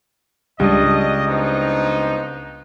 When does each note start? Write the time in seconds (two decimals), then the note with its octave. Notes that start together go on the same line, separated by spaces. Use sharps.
0.60 C#2 G3 D4 D#5
1.28 B3 C4 D#4